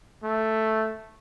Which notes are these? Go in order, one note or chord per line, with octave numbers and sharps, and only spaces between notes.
A3